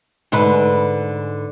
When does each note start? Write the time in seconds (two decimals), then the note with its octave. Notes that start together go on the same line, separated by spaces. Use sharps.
0.32 G#2 D3 B4